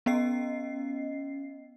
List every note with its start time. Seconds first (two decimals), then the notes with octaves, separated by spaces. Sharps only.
0.06 B3 C#4 D#5 C7